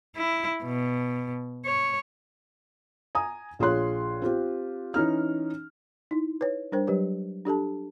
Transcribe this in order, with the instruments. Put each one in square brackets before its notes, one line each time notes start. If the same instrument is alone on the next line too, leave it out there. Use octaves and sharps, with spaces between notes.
[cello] E4
B2
C#5
[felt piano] G#5 A#5 D#6
A#1 F4 G#4 C#5 C6 F#6
C4 F4 G4
E3 C#4 D#4 F6
[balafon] D#4 E4
B4 C#5
G3 D4 A#4 C5 G5
F#3 G3 G4 B4 C#5
D4 G4 A4 A5